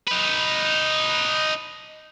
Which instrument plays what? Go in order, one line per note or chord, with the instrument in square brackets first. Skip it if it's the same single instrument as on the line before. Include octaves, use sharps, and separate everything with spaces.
[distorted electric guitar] D#4 B4